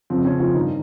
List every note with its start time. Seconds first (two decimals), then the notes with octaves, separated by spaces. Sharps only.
0.10 F2 C#3 F3 C4
0.25 C#4
0.40 F3 F4
0.55 G2 D#3 D#4